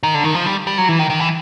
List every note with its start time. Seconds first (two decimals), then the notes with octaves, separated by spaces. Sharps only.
0.03 D#3
0.14 D3
0.24 D#3
0.35 F3
0.46 G3
0.67 G3
0.78 F#3
0.89 E3
0.99 D#3
1.10 D#3
1.20 E3